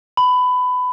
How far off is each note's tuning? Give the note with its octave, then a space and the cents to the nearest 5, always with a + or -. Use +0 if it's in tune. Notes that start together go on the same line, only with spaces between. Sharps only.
B5 +20